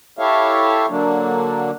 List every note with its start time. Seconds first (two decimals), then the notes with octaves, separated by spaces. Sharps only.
0.19 E4 G4 A4 C#5 E5 F5
0.89 D3 F#3 A#3 D4